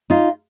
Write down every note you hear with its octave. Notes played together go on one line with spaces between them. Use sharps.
D#4 F4